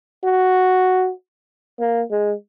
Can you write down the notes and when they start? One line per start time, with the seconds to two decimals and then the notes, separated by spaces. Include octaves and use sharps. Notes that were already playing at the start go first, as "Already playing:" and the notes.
0.24 F#4
1.80 A#3
2.11 G#3